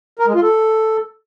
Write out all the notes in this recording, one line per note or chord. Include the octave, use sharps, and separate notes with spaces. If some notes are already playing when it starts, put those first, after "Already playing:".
A#4
G#3
F4
A4